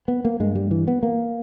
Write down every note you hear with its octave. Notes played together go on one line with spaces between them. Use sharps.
B3
A#3
G2 G#3
G3
E3
B3
A#3